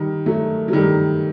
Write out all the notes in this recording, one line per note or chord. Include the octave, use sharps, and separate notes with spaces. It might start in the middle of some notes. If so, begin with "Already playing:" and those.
Already playing: D#3 G3
F#3 A3
F#3
D#3 G3